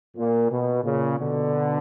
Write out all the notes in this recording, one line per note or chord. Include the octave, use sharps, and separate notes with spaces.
A#2
B2
A#2 C#3
B2 D3